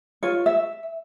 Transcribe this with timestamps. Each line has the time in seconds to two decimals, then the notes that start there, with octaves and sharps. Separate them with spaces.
0.23 F4 C#5
0.46 E5